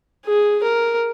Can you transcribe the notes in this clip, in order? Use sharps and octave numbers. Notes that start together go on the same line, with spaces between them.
G#4
A#4